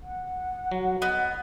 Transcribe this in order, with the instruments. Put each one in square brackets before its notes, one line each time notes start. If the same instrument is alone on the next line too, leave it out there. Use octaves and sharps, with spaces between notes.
[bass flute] F#5
[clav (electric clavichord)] F#3
[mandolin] B3 [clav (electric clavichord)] D#5